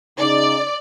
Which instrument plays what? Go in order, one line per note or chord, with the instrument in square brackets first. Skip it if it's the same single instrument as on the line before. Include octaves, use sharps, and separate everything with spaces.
[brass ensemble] C#3 D#4 [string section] D5